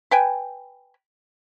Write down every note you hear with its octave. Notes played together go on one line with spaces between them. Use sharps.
B4 G5 G#5